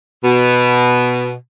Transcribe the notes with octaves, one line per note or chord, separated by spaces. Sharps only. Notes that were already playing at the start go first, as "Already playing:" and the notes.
B2